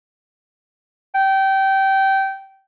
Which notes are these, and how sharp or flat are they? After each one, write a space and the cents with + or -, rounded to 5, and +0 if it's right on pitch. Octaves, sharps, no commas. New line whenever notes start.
G5 -20